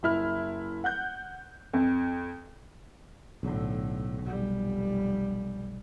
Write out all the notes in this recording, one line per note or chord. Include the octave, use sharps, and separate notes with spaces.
F#1 E4 F6
F#5 F#6 G6
F2
B1 A2 D3
F1 G3